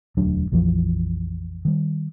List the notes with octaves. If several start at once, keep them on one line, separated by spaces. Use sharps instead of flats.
E1 D2 F#3 D4
A#1 F2 E3 F3
D#3 G3